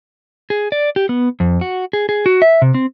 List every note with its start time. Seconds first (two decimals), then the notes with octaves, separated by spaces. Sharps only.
0.50 G#4
0.72 D5
0.96 G4
1.09 B3
1.40 F2
1.61 F#4
1.93 G#4
2.09 G#4
2.26 F#4
2.42 E5
2.62 C3
2.74 C4